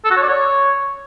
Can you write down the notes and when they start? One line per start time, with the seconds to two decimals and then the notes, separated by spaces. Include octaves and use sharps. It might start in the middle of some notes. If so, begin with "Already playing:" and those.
0.05 A4
0.11 F#4
0.17 C#5
0.23 D5
0.29 C#5